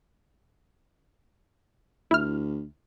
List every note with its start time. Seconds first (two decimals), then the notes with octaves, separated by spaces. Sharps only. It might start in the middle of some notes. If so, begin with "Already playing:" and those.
2.11 D2 E4 F6